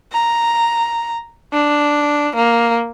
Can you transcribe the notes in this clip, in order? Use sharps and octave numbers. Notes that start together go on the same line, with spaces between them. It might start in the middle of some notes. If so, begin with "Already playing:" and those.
A#5
D4
A#3